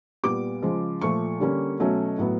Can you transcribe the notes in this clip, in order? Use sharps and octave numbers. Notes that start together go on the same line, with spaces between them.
A#2 G3 B3 D6
C#3 F3 G#3
A#2 F3 A3 C#6
D3 G3 A#3 C#4
B2 F#3 A3 C#4
A2 F#3 B3